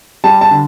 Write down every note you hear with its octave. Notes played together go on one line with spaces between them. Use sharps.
G3 A5
A5
D3